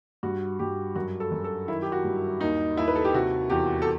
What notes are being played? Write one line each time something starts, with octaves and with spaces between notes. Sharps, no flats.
G2 F#4
G2 G4
F#2 F#4
A4
F#2
A4
D#3 E4
G4
F#4
G2
D#2 D#4
D#2 E4
B4
A4
G4
C3 F#4
E2 G4
A4